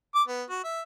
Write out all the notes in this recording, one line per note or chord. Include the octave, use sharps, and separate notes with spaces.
D6
B3
F#4
E5